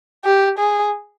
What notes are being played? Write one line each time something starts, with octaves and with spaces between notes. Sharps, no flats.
G4
G#4